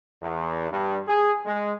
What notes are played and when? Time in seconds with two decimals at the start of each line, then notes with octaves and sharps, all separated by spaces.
0.21 E2
0.71 G2
1.07 G#4
1.45 G#3